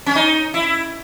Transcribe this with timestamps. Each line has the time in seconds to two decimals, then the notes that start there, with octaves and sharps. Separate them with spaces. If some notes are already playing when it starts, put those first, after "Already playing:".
0.06 C#4
0.15 D#4
0.54 E4